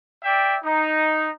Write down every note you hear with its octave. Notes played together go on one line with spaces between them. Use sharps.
D5 E5 G5
D#4